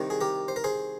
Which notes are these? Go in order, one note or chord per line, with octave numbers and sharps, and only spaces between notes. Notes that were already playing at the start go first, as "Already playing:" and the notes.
Already playing: C2 C3 D#3
G#4
G4 A#4
C5
A#4
G#4 C5